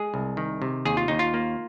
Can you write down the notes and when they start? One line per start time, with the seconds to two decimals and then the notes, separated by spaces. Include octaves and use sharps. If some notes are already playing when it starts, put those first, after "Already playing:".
Already playing: G#3 G#4
0.14 C2
0.37 D#3
0.62 C3
0.85 D#2 G#4
0.97 F4
1.08 D#2 D#4
1.19 F4
1.34 A#3